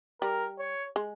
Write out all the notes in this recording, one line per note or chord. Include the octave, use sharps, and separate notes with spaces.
G3 A#4
C#5
G#3